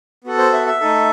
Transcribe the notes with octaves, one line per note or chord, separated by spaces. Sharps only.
B3 F#4 A4
C5
E5
E5
A3 D#4 A4